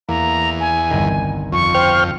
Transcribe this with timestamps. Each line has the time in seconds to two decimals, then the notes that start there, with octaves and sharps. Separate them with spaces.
0.09 E2 A#3 A#5
0.60 G#5
0.91 G1 C2 D#3
1.53 F2 C#6
1.74 C5 G5 F6